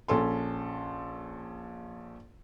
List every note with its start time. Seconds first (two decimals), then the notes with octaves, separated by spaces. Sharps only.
0.08 A#1 C#4 A4 C6